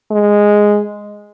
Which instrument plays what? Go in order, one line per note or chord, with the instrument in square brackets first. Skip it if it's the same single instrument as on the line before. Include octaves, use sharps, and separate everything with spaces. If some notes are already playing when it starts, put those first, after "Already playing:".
[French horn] G#3